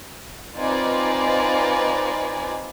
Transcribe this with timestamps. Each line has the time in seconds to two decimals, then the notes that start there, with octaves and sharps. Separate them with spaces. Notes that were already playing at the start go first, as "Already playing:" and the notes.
0.57 C4 D#4 F4 B4 D5 G#5